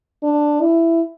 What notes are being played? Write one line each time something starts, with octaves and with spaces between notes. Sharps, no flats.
D4
E4